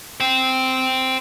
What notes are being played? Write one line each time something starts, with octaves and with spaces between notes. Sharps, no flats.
C5 G5